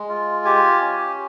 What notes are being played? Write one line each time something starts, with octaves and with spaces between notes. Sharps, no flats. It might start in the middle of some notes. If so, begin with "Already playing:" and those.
Already playing: G#3
F4
G4 G#5
C#4